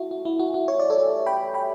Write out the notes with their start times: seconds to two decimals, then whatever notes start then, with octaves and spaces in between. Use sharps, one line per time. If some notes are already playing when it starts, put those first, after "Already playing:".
Already playing: A3 E4 F#4
0.11 F#2 F#4
0.25 E4
0.39 E3 A3 F#4
0.54 F#4
0.68 F#2 C#5
0.79 D5
0.90 A4 C#5
0.98 E3 G3
1.26 F#2 G5 B5
1.54 E3 G3 G5 B5